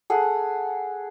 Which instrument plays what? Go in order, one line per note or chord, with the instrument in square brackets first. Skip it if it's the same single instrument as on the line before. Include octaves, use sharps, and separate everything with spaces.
[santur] G#4 A4 F#5